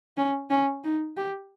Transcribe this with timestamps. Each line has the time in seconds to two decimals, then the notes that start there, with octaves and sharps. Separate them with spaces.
0.17 C#4
0.50 C#4
0.84 D#4
1.17 G4